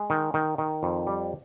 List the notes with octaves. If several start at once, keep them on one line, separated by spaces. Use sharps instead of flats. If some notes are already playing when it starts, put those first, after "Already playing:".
Already playing: G#3
D#3
D#3
D#3
F2
G3